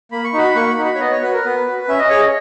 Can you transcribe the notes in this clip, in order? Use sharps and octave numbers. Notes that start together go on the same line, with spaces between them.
A#3 B5
C#6
D#4 F#4 B5
A#3 C#6
B5
D#4 F#4
B5
C#5
B3 D#5
C#5
F#4 B4
A#4
B3 B4
F#4
C#4 E5
D#5
G#4 C#5
D#5